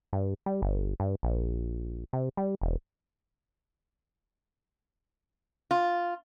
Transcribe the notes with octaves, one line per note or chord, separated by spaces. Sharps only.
G2
G3
G1
G2
A#1
C3
G3
E1
F4